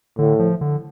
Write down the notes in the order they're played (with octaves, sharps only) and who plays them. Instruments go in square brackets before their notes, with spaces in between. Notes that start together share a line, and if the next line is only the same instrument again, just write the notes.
[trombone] A2 [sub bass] D3
[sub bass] F3
D3